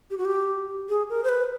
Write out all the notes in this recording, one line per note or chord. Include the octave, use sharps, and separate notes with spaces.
G4
F#4
G4
G#4
A#4
C5
B4